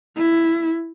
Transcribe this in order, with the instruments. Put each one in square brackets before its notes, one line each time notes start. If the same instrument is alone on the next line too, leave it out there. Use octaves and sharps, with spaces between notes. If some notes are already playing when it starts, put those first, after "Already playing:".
[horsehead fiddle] E4